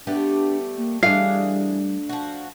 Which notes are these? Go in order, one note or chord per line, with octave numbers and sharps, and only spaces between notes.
G3 A3 B3 D4 G4
A#3
E3 G3 A3 D4 G#4 D#5 F5
F3 F#4